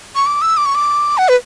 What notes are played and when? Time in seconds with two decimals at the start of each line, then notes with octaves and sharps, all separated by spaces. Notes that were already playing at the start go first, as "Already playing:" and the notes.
0.16 C#6
0.26 D6
0.42 E6
0.57 D6
0.66 C#6
0.75 D6
1.18 F#5
1.29 B4